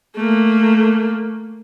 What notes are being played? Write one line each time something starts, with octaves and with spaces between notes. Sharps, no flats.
A3 A#3